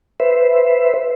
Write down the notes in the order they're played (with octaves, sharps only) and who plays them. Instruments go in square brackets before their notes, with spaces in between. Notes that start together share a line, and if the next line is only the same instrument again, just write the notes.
[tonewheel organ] B4 C5 E5